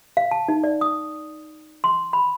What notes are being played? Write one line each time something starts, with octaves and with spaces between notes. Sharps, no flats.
F5
A5
D#4
D5
D#6
C6
B5